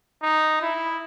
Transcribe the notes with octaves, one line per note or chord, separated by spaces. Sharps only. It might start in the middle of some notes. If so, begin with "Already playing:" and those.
D#4
E4